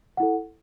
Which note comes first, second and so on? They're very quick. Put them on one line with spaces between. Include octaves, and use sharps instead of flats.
F#5 E4 A4